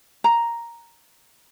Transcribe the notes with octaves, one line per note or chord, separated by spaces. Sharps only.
A#5